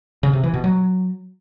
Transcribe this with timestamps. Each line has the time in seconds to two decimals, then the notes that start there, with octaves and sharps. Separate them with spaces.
0.23 C#3
0.33 C3
0.43 E3
0.54 B2
0.64 F#3